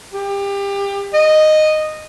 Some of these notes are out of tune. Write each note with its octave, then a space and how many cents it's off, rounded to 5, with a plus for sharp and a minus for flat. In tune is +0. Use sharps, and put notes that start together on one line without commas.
G4 +25
D#5 -10